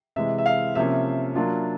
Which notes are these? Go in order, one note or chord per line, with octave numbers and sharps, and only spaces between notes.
C3 E3 G#3 E5
E5
F5
C3 F3 A#3 C#4 E5
F#3 A#3 D4 F4